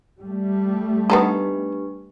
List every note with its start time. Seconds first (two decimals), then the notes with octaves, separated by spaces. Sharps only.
0.20 G3 A3
1.10 B3 D4 D#4 G4 A4 B4